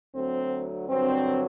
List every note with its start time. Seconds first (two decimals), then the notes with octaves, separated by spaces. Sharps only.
0.13 D2 D3 F#3 C4
0.89 G2 D3 F#3 C4